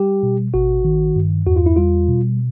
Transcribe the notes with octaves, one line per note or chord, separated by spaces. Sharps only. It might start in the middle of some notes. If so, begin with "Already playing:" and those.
Already playing: G3 G4
B2
G#1 F#4
D#3
G2
E2 F#4
F4
E4
G3 F4
B2